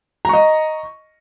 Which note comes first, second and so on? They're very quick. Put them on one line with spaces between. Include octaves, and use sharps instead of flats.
A#5 C#6 D#5